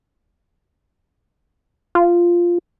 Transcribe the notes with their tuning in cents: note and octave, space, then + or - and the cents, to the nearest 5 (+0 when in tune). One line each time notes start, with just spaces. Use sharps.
F4 -5